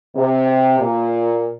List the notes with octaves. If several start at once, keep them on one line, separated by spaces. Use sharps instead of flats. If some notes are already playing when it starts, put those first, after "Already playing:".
C3
A#2